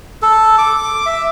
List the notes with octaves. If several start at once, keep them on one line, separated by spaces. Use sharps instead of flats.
A4
D6
E5